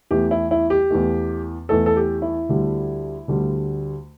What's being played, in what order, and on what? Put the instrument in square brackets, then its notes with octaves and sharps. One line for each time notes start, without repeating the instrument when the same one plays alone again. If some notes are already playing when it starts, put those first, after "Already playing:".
[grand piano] E2 E3 A3 G4
E4
E4
G4
E2 E3 A3
E2 E3 A3 A4
A4
G4
E4
D2 D3 G3
D2 D3 G3